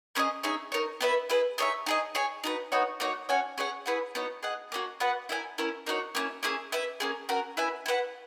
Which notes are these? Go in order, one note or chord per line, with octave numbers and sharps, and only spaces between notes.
A#3 C#4 G#4 D#5
D#4 G#4 C#5 E5
D#4 A#4 C#5
B3 E4 B4 E5
E4 G#4 B4
D#4 G#4 C#5 E5
D#4 G#4 D#5
G#4 C#5 G#5
D#4 F#4 B4
B3 D#4 F#4 C#5
A#3 D#4 F#4 C#5
C#4 F#4 C#5 G#5
C#4 G#4 C#5 F#5
E4 G#4 B4 F#5
B3 D#4 F#4 C#5
G#4 D#5 F#5
A#3 C#4 F#4
B3 F#4 B4 F#5
E4 A#4 E5 G#5
C#4 E4 A#4
A#3 D#4 F#4 C#5
A#3 C#4 E4
A#3 C#4 E4 G#4
E4 B4 E5
A#3 C#4 G#4
C#4 F#4 A#4
E4 B4 E5 G#5
E4 B4 F#5